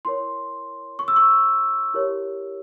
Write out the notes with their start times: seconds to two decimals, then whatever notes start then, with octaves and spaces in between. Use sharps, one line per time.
0.05 E4 A#4 C#5 C6
0.99 C#6
1.08 E6
1.16 C#6
1.94 E4 G4 A#4 C#5